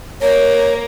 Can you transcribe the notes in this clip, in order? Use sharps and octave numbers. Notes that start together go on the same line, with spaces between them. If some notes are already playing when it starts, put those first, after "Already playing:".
A#3 A#4 C#5